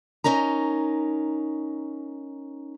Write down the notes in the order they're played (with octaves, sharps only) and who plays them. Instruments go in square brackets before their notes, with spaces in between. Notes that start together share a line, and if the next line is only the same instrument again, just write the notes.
[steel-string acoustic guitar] C#4 D#4 A#4 A#5